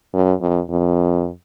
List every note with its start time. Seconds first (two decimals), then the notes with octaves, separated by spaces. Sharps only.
0.13 F#2
0.41 F2
0.70 F2